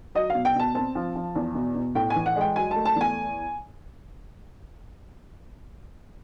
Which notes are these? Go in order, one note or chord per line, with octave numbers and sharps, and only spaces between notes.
F#3 D#5
F5
B2
G5
B2 A5
C4 A5
F3
F3
E2
B2
B2
A2 G5
G#5
E3
F#5
G#3 G5
F#3 G#5
A5
A3
A5
E2
G#5